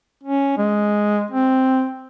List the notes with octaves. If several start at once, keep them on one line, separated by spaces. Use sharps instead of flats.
C#4
G#3
C4